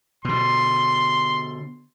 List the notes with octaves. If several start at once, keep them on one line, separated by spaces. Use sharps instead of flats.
B2 D3 C6